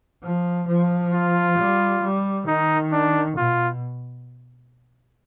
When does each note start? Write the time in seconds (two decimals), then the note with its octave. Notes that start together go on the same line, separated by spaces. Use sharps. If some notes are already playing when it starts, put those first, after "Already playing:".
0.23 F3
0.68 F3
1.13 F4
1.58 G3
2.03 G3
2.47 D#3 D#4
2.92 D4
3.37 B2 F4